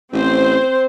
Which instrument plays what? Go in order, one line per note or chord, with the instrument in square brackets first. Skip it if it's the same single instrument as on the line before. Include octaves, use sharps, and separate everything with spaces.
[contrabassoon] A1 [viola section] C4 C5